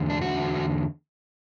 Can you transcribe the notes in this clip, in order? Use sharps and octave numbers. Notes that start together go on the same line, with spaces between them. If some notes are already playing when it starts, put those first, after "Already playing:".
Already playing: E2 D3
D4
F#4
E2 D3